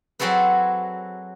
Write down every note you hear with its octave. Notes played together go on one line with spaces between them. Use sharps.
F#3 C4 F#4 G#4 A4 B4